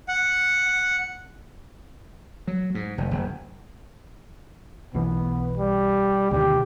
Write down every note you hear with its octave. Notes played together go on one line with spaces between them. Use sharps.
F#5
F#3
G#2
F1
F#1
B1 B2 E3 B3
G3
D2 B2 D#3 G4